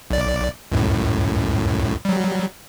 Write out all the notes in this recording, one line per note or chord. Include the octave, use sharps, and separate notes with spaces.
B1 D5
C#2 F#2 A2
F#3 G3